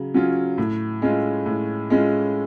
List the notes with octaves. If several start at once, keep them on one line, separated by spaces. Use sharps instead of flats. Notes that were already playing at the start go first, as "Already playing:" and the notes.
Already playing: C#3 F#3
F#3 C#4 F4
A2
G#3 C#4 F4
A2
G#3 C#4 F4